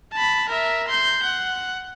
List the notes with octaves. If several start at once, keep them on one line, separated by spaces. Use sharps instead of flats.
A5 B5
A#4 E5
C6 G6
F#5